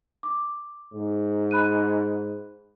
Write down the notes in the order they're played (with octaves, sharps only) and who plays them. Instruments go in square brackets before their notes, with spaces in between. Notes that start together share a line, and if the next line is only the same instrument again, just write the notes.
[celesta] D6
[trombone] G#2
[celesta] B5 F#6 D#7